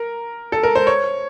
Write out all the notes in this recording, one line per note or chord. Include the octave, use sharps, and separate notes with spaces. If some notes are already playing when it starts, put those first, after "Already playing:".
Already playing: A#4
A4
A#4
C5
C#5